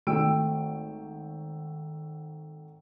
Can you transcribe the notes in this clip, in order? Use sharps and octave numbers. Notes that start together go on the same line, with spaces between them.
G#1 A3 G5 E6 D7